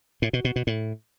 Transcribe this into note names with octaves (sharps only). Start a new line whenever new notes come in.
A2
B2
B2
B2
A2